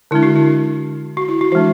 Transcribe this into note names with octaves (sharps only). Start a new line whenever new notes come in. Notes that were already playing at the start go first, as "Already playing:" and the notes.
D3 G#3 D4 E4
F#4
E4
F#4
E4
F#4
E3 G#3 D4 F#4